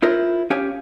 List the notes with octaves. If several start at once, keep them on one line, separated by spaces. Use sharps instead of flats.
E4 F4 A#4 C5
C#4 G4 C#5 F5 G#5